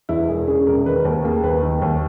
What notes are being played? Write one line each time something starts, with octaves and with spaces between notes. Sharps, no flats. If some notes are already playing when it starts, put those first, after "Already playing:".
E2 E4
E1 G#4
C#3 G#4
E1 A#4
D#3 B4
D#2 A#4
A#3 G#4
D#2 B4
D#3
D#2